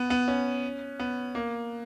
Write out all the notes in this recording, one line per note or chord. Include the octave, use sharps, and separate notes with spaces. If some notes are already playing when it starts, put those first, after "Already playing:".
Already playing: B3
B3
C#4
B3
A#3